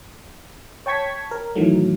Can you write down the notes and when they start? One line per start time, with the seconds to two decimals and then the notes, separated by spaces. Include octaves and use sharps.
0.86 C#5 G5 A5 C#6 G#6 B6
1.31 A#4
1.55 A2 D#3 E3 F#3 A3